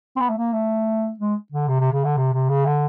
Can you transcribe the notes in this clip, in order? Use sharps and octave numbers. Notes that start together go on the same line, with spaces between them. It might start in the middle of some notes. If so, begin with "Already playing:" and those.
C4
B3
A3
A#3
A3
G#3
D3
C3
C3
C#3
D3
C3
C3
C#3
D3